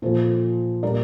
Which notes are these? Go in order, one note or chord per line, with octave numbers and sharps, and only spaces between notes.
A#2 F3 A4 C5
A#2 G3 A#4 D5